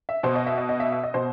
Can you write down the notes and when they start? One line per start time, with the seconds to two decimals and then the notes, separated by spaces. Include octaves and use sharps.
0.09 E5
0.23 B2 C5
0.35 D#5
0.46 E5
0.58 D#5
0.69 D#5
0.80 E5
0.92 E5
1.04 D#5
1.14 B2 C5